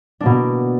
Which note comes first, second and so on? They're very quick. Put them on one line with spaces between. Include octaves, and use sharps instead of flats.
D4 A#3 B2